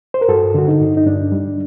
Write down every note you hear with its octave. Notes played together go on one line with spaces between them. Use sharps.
C5
A#4
G2 F#4 A4
D3 F#4
D#4
G2
D#4
G2 D4
G3